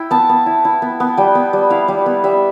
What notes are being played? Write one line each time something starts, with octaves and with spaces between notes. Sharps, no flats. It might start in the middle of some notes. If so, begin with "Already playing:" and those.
Already playing: E4 E5 G5
B3 A5
B3
E4
E4
B3
B3
G3 G5
B3
G3
E4 F5
G3
B3
G3 E5